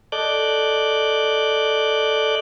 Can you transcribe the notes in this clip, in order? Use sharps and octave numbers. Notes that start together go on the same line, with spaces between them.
A4 D5 D#5 D6 F#6 G6